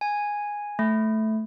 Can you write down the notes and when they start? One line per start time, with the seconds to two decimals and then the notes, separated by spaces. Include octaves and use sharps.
0.01 G#5
0.79 A3